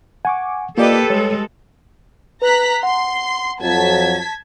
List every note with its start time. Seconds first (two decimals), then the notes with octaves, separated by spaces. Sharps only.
0.25 F#5 G#5 C#6 D6
0.78 A#3 F4 G4 A4 B4 D5 D#5
1.10 G3 G#3 C#5
2.42 B4 A#5 F#6 B6
2.83 F#5 C6
3.62 F2 F#3 A5 G#6 B6